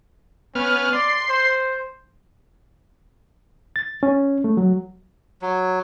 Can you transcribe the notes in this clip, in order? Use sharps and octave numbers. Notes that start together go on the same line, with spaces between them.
B3 C#4 F6
D5 C6
C5
A6
C#4
A3
F#3
F#3